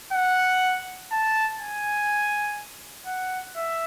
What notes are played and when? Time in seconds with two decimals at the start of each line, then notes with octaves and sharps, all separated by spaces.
0.13 F#5
1.11 A5
1.60 G#5
3.07 F#5
3.56 E5